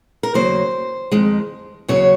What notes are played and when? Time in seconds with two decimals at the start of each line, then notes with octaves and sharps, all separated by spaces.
0.23 A#4
0.34 D#2 C#3 F#3 A#3 C5
1.12 F2 D#3 G#3
1.88 D#2 C#3 F#3 C#5